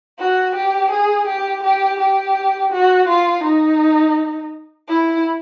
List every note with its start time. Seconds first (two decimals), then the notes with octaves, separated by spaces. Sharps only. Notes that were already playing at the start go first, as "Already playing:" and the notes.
0.19 F#4
0.55 G4
0.91 G#4
1.27 G4
1.63 G4
2.00 G4
2.72 F#4
3.08 F4
3.43 D#4
4.88 E4